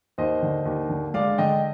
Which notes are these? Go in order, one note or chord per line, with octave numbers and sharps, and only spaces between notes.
D#2 C5 D#5
D3
D#2
D3
G#3 D5 F5
D3 D#5 G5